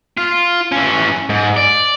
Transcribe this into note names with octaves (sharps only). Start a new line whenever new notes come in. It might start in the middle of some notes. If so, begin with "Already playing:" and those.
F4
E3 C#4
G#2
D5